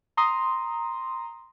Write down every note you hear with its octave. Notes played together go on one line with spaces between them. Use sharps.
A#5 C6 D#6